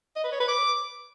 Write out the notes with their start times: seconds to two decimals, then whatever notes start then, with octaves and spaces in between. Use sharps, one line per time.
0.16 D#5
0.24 B4
0.32 C#5
0.40 B4
0.48 D6